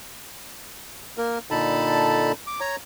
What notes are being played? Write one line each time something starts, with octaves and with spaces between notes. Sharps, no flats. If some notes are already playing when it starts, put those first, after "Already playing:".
A#3 A#4
A#2 D3 D#4 A4 A5 B5
D6
C#5 A#5